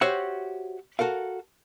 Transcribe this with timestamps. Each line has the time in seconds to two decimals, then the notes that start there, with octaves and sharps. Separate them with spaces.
0.01 F#4 G4 C5 C#5 E5 F#5
0.99 F#4 A4 A#4 F5